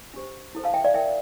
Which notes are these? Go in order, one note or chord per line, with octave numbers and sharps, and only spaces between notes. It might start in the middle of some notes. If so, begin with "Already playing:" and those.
D4 G4 C5
E4 A4 C5
F5 A5
E5 G5
D5 F5
E4 A#4 E5 G5